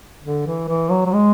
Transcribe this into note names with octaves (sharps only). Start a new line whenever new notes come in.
D3
E3
E3
F#3
F#3
G#3